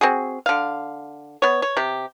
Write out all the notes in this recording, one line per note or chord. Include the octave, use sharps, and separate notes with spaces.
C4 F#4 G#4
D3 F5
B3 C#5
C#5
C3 G4